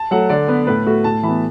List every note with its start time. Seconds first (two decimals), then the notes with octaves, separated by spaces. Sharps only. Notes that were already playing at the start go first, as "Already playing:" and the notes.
Already playing: A5
0.11 F#3 A3 F#5
0.29 D3 D5
0.48 B3 B4
0.67 A2 B4
0.86 A3 F#4
1.04 A2 A5
1.23 E3 B5
1.28 B3